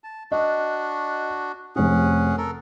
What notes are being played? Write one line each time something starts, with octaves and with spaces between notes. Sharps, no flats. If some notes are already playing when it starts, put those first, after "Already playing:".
A5
D4 F#4 D#5
F1 C3 C#4 G#4 F#5
A4 A#4